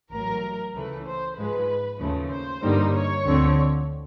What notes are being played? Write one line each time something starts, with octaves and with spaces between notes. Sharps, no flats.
A1 A2 F#3 A#4
C#2 C#3 E3 A3 B4
C5
G#2 F3 G#3 B4
D#2 C#3 F3 A3
C5
G2 D3 G3 A#3 D#4
C#5
D2 D3 F3 A3 C4